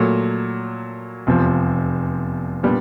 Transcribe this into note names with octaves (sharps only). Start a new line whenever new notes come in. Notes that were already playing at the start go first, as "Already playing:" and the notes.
Already playing: A#2 F#3 A3
F1 E2 C3 F3
A#2 G3 B3 D4